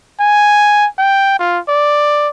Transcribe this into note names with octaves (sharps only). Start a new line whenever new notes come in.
G#5
G5
F4
D5